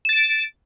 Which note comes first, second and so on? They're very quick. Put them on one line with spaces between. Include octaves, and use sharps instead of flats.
E7 A6 D7